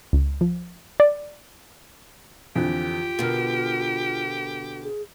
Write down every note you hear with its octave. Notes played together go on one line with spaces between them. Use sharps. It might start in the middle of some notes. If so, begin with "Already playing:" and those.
C#2
F3
D5
F2 D3 E3 F4 G4
B2 D3 A4 A#4
G#4